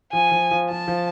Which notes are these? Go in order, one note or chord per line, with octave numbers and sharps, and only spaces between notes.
F3 G#5
F3
F3
F3 A5
F3